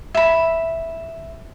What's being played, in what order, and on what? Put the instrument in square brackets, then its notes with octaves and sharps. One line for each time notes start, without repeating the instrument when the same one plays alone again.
[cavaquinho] E5 B5